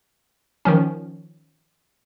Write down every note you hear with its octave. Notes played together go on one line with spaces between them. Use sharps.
D#3 F3 C#4